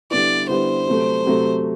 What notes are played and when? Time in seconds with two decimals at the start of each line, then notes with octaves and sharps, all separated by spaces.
0.11 D3 G3 B3 E4 D5
0.49 D3 G3 B3 E4 C5
0.87 C3 F#3 A3
1.26 C3 F#3 A3